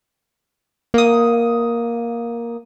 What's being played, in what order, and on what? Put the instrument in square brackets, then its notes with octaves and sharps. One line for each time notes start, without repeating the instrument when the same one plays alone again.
[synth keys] A#3 D#6